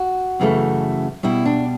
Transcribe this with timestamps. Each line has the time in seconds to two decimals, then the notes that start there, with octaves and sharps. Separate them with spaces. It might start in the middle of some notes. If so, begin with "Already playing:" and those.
Already playing: F#4
0.40 F#2 C#3 E3 A3
1.23 B2 G3 E4
1.45 D4